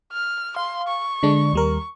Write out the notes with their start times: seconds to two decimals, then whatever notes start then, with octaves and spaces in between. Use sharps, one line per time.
0.12 F6
0.56 F5 C6
0.87 C#6
1.23 D3 G#3 D4
1.53 D#2 G3 A#4